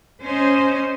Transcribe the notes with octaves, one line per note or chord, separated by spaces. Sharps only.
C#4 C5 D#5